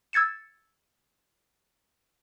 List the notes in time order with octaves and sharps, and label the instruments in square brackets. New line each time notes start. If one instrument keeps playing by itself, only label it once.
[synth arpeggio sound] E6 G#6 A6 C#7 E7